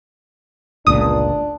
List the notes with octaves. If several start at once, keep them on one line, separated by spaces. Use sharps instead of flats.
G1 C#2 A#2 D4 D#6